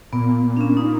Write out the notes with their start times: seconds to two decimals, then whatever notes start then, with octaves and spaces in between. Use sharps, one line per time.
0.13 A#2 B3
0.57 D4
0.61 C#4
0.77 D#4